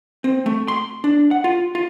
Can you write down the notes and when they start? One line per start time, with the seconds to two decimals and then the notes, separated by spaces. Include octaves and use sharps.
0.24 C4
0.46 A3
0.68 C6
1.04 D4
1.31 F#5
1.44 F4
1.75 F4